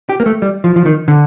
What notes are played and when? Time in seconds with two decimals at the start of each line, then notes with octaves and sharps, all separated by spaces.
0.09 G4
0.20 A#3
0.26 A3
0.42 G3
0.64 F3
0.76 F3
0.86 D#3
1.08 D3